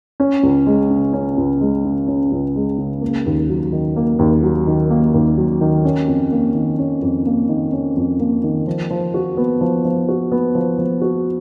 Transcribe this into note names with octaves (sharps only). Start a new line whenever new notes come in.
C#4
C#2
G#3
C#3
C#4
C#2
G#3
C#3
C#4
C#2
G#3
C#3
A#3
D#2
F#3
D#3
A#3
D#2
F#3
D#3
A#3
D#2
F#3
D#3
C#4
F2
A#3
D#3
C#4
F2
A#3
D#3
C#4
F2
A#3
D#3
F3
F3
F#4
B3
F3
F3
F#4
B3
F3
F3
F#4